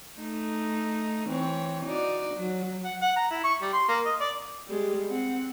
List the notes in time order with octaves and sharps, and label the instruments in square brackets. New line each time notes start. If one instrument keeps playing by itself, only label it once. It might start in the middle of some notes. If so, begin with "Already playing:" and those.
[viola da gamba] A3 D#4
E3 C4 C#5
D#4 F#4 D5
F#3
[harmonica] F#5
F#5
A#5
E4
C#6
G3
C6
A#3
D#5
D5
[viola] G3 G#3
C4 F#5